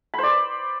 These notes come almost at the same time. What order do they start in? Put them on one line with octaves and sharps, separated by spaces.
B5 C5 D5